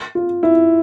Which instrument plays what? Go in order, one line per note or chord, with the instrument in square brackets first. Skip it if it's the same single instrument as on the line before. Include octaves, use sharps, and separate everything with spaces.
[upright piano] F4
E4